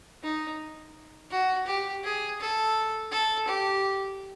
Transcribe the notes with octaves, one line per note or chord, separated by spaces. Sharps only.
D#4
F#4
G4
G#4
A4
A4
G4